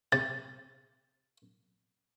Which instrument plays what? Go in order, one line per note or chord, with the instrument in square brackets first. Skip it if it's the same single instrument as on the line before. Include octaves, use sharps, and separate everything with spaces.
[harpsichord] C3 [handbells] A6